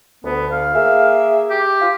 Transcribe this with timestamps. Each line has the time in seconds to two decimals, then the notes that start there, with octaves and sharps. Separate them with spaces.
0.24 D2 B3
0.51 F5
0.75 A#3 G#4 E5
1.50 G4
1.80 F4